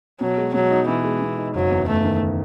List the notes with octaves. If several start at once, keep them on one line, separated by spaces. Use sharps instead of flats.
B2 F#3
G#3
B2 F#3
D#4
B2 E3
G#3
B2
D#4
F#1 F#3
E2
F#1 A3
D#3